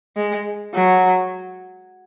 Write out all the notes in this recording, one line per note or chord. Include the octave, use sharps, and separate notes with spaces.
G#3
F#3